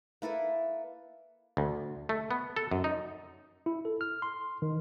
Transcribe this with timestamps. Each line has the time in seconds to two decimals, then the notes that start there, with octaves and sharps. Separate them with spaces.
0.22 A#3 E4 A4 B4
1.57 D2
2.09 A3
2.31 B3
2.56 A4
2.71 F#2
2.84 D#4
3.66 E4
3.85 A4
4.01 F6
4.22 C6
4.62 D#3